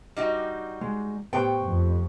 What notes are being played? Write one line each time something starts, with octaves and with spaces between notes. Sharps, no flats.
G3 D#4 F#4
G#3
A2 B3 G4 B4 C5 G5 C#6
F2